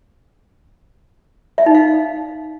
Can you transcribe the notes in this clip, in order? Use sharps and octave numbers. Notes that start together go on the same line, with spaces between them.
E5
D#4
F5